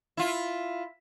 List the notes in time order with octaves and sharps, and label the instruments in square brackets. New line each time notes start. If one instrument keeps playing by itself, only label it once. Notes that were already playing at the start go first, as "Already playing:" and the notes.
[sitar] E4 F4